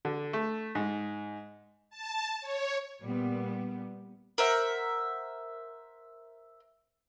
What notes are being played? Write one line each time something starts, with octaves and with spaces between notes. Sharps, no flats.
D3
A3
G#2
A5
C#5
A#2 G3 B3
A#4 C5 E5 F#5